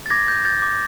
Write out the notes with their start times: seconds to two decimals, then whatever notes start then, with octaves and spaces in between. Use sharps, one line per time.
0.06 A6
0.10 D6 G#6 A#6
0.28 G6
0.45 G6 A6
0.62 D6